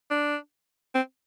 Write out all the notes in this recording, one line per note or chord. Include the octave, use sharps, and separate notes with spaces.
D4
C4